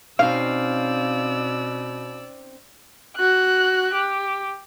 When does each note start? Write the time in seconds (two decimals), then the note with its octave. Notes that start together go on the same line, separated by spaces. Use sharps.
0.19 B2 C4 C#4 D#4 D5 F5 E6
3.16 F#4 F#6
3.94 G4